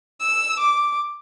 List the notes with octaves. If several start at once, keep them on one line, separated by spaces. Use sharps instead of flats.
E6
D6